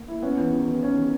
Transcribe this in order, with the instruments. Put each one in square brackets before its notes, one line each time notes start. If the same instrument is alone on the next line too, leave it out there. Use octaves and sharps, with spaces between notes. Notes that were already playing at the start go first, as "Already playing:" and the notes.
Already playing: [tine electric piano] A#3
[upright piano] E4
[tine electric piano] B3 [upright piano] C#4
[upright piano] E2
D#3
D#3
C#4
D#3